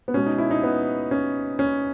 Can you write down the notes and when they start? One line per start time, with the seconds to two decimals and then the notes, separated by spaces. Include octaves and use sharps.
0.08 B3
0.14 B2 G#3 C#4
0.26 D#4
0.38 E4
0.51 D#4
0.63 B3
1.11 C#4
1.59 C#4